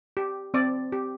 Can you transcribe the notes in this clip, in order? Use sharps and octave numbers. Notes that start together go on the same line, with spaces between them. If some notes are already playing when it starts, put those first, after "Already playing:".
G4
C4 D5
G4